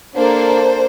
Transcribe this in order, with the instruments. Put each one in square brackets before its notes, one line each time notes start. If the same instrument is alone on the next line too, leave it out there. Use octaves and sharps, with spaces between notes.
[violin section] A#3 D4 A4 C5